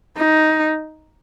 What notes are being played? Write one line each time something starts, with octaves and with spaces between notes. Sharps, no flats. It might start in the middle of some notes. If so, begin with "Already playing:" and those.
D#4